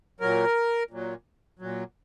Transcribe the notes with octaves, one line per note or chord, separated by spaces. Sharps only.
A#2 F#3 A#4
A#2 F#3
A#2 F#3